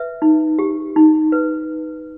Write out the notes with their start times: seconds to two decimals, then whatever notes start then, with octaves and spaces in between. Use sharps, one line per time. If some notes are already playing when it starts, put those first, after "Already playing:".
Already playing: B4 E5
0.22 D#4
0.59 G4
0.96 D#4
1.32 B4